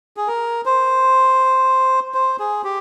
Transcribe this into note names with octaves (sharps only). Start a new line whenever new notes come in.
G#4
A#4
C5
C5
G#4
G4